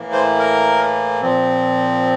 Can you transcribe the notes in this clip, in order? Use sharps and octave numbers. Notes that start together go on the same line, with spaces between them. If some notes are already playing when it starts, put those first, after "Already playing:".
Already playing: A2 E3 A#3
C5
A#4
A#2 F3 C4